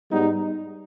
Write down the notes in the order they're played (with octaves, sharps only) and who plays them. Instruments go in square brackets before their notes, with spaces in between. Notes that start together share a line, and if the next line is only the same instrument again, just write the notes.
[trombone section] G#2 G3 B3 D#4